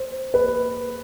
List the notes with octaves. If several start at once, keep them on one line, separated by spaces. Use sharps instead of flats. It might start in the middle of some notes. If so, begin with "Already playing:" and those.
Already playing: C5
B4